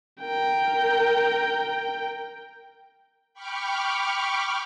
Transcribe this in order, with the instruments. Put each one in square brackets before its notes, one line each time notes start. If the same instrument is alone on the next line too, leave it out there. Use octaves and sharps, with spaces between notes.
[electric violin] A#4 G5
[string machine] G5 B5 C#6 D6 F6